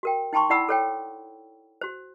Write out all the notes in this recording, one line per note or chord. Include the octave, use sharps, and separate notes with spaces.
F#4 A#4 G5
D#4 G5 A5 C6 C#6
E4 D5 F#5 B5 E6
A4 C#5 G5
F#4 C5